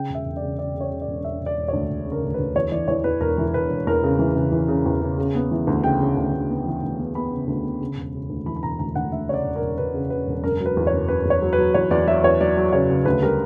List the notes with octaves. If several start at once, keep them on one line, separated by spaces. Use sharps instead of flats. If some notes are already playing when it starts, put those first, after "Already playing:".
Already playing: C#3 G5
E1
E5
E1
D5
C#3
C#3 D5
C#3
C#5
C#3
D5
E1
E1 E5
E1
D5
E1
D2 C#5
E1
C#3
A#4
D2
D2 B4
E2 C#5
E3 D5
E3 C#5
E2 B4
E1 A#4
E3
E1 B4
E1
E2 A#4
C#3
E3
C#3
E3
C#3
E2
C#3
C#3
B3
E3
D2
C#3 G5
C#3
D2
D2
B3
E3
D2
B3
B3 B5
C#3
D2
B3
C#3
E1
C#3
D2
E3 B5
B5
E1 A#5
D2 A#5
D2 F#5
D2 E5
C#3 C#5
D5
E1
A#4
E1
E1 B4
C#3
C#3 B4
E1
F#1 A#4
F#3
B4
E2
C#5
F#1
F#1 B4
E2
C#5
F#3
B4
F#3
E2 C#5
E2 D5
F#3 E5
E2 C#5
F#3 D5
F#3
C#3 C#5
C#3
D2 B4
G3 A#4